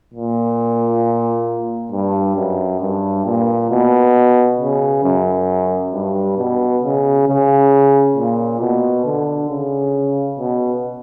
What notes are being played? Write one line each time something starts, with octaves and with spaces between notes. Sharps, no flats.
A#2
G2
F#2
G2
A#2
B2
C#3
F#2
G2
B2
C#3
C#3
A#2
B2
D3
C#3
B2